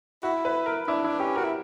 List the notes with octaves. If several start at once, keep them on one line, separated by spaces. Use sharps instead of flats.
E4 F#4
B4
A#4
D4 E4
E4
C#4 G4
F#4 A#4
E4